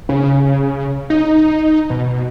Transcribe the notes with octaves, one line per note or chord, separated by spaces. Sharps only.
C#3
D#4
B2